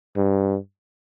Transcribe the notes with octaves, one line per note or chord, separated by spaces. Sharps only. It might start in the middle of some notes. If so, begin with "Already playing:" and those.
G2